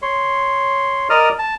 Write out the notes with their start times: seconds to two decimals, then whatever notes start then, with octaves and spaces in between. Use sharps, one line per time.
0.02 C#5 C6
1.10 A#4 D5 D#5 D#6 F6
1.39 A5